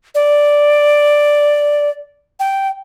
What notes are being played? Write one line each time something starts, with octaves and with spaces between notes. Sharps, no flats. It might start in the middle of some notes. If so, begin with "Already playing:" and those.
D5
G5